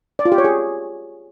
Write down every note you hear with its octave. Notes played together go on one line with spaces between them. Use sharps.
D5
F4
G4
C#5
G#4